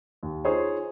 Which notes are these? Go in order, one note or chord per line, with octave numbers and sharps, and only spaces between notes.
D#2
D#4 F4 G#4 C5 C#5